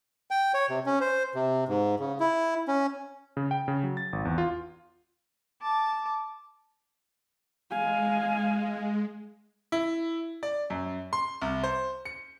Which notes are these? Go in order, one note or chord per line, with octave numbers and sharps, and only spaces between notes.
G5
C#5
C3
C#4
C5
C3
G#2
C#3
E4
C#4
C#3
G5
C#3
F#3
A6
G#1
E2
F4
A5 D6
G#3 F5 G#5
E4
D5
F#2
C6
C2
C5
C#7